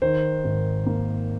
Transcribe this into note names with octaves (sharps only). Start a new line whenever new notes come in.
D#3 C5
G#1
A#3